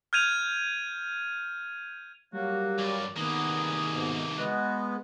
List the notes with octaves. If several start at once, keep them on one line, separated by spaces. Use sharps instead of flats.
F6 G6 G#6 D#7 F7
F#3 G3 A#3 F#4
G2 D5
C2 D#3 A#3 B3 G#4
G#2 B2
G#3 B3 F#4